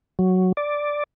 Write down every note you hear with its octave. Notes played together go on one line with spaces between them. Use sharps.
F#3
D5